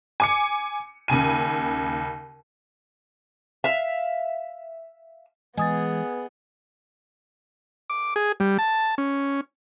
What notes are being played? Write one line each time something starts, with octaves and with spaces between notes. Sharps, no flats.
G#5 D6 C#7
D#2 C#3 G#5 D#7
E5 F5
E3 G#3 B3 G#4 D#5 D#6 A6
D6
G#4
G3
A5
C#4